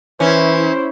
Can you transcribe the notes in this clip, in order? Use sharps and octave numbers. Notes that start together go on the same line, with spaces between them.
E3 C#4 E4 C5